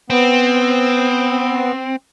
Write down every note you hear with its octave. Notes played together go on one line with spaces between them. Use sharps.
B3 C4